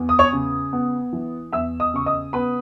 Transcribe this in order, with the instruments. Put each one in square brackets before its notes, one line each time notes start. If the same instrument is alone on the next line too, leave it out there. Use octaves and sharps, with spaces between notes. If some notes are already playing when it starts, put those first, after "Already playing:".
Already playing: [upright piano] E2
D#6
C#5 C#6
C#3
B3
E3
E2 E5 E6
D#5 D#6
C#3 C#6
D#5 D#6
B3 B4 B5